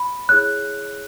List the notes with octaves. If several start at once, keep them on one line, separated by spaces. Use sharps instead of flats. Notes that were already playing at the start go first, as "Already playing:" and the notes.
Already playing: B5
E4 G#4 C#5 F#6